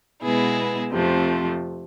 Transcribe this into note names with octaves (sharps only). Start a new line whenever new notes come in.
B2 G#3 B3 E4 G#4
F2 C3 F3 A3